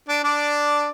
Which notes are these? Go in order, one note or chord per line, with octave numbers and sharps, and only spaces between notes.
D4 D5
D4 D5